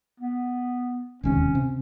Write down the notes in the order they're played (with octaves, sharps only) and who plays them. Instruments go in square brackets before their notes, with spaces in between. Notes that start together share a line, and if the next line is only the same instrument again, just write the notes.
[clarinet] B3
[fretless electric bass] E1 D#2 C3 [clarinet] C#4
[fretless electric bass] C3